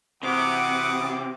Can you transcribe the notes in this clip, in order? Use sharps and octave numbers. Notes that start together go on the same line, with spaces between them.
C3 E3 F#4 F#5 D6 D#6